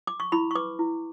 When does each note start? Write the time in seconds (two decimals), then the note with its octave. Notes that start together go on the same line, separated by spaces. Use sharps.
0.07 D6
0.20 C#6
0.32 E4 B5
0.51 C#6
0.55 B4 D6
0.79 E4